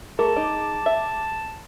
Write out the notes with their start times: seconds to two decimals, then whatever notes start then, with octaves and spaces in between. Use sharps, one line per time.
0.19 A3 G#4 A#4 A5
0.36 D#4 D6
0.86 E5